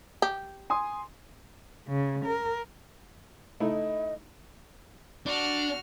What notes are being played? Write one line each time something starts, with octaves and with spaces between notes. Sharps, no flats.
G4
G#5 C6 D#6
C#3
A#4
A3 D#4 E4 D#5
D4 F#4 F6